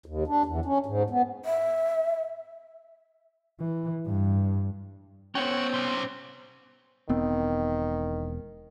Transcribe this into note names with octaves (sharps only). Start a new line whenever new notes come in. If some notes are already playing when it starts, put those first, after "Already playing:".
D#2
D4
E2
C#4
G#2
B3
E5
E3
G2
B3 C#4 F#4 C5 C#5 G5
C3 G3
E1 D#3 B3 C4